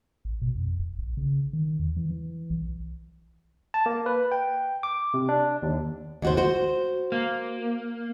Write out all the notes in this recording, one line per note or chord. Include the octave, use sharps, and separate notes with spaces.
A1
B2
F2
D1
A#1
C#3
D#3
E2
E3
E3
B1
A5
A#3
B4
G5
D6
C3
D4
D#2
D#2 F#4 C5
F#4 C5
A#3